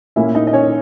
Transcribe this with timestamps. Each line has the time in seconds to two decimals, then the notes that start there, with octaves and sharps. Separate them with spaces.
0.16 A#2 A#3 C#4 E4 E5
0.35 D#4 D#5
0.47 D#5
0.53 C#4 C#5